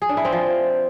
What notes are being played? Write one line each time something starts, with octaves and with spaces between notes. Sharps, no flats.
G#4
D4
E4
C4
F3